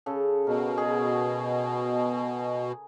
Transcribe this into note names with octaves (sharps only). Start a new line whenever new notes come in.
C#3 A4
B2 A#4
G#4